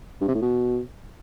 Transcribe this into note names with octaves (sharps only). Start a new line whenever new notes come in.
G2
C3
A2
B2